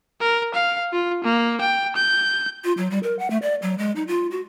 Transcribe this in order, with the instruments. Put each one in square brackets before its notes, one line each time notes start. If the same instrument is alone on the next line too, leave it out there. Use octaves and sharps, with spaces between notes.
[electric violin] A#4
F5
F4
A#3
G5
G6
[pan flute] F4
F#3
G3
A#4
F#5
A3
D5
F#3
G#3
D#4
F4
F#4